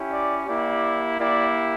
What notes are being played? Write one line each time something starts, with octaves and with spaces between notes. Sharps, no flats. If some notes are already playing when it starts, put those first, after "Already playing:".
Already playing: C#4 E4 G4
D5
A#3 E4 G4 D5
A#3 E4 G4 D5